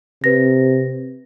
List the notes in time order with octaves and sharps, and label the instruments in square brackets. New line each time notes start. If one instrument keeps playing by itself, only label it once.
[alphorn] C3 [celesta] B4 A#6